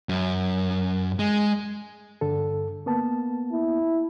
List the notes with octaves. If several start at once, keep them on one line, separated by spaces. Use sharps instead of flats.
F#2
G#3
G2 D3 A4
A#3 B3 A5
E4